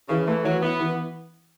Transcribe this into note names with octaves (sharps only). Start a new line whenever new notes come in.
C#3 E3
E3 A3
E3 F#3
B3 E4
E3